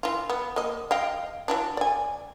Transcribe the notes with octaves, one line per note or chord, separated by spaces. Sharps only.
E3 F4
B3
A#3 D#5
D#5 F5 G5
E3 F#3 D4
D5 G#5